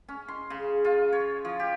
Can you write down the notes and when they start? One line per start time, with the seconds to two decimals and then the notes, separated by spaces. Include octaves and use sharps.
0.08 C#4
0.28 C6
0.50 C#3
0.85 F4
1.13 C#5
1.45 F3
1.60 G4